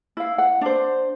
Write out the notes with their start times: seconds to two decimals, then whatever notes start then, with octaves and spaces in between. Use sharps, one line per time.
0.17 E4 F5
0.38 F#5
0.61 D4 C5